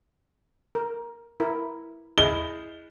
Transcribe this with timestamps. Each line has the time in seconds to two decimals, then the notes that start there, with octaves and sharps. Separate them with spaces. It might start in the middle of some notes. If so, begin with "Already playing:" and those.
0.75 A#4
1.40 E4 A#4
2.18 E4 G#4 D#5 G7